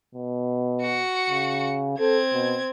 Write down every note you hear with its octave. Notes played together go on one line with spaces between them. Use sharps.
B2
F#4 C#7
C#3
C4 A4 G#6
B2